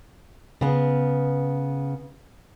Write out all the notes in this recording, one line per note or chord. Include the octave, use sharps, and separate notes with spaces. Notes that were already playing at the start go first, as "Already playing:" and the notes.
C#3 B3